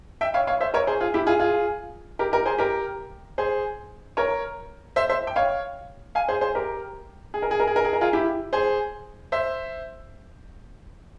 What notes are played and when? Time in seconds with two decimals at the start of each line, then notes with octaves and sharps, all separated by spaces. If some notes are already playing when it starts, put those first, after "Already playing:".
0.21 E5 G5
0.34 C#5 F5
0.47 C#5 F5
0.61 C5 E5
0.74 A#4 C#5
0.87 G#4 C5
1.00 F4 G#4
1.14 E4 G4
1.27 F4 G#4
1.39 F4 G#4
2.19 G4 A#4
2.32 G4 A#4
2.46 G#4 C5
2.58 G4 A#4
3.38 G#4 C5
4.17 A#4 C#5
4.96 C5 E5
5.09 C5 E5
5.27 G5
5.36 C#5 F5
6.15 F5 G#5
6.28 G#4 C5
6.41 G#4 C5
6.55 G4 A#4
7.34 G#4
7.42 A#4
7.51 G#4
7.60 A#4
7.67 G#4
7.76 A#4
7.85 G#4
7.93 A#4
8.01 F4 G#4
8.13 E4 G4
8.53 G#4 C5
9.32 C5 E5